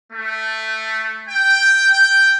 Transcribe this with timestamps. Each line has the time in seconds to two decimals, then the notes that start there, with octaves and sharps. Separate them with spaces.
0.12 A3
1.29 G5
1.92 G5